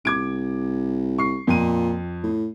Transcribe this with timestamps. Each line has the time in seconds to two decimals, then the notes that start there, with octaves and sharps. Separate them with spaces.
0.05 C2 D6 G#6 D7
1.18 C#6 C7
1.47 F2 A#2 D#7
2.23 A2